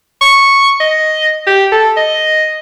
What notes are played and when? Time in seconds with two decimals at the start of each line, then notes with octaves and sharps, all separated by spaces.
0.21 C#6
0.80 D#5
1.47 G4
1.72 A4
1.97 D#5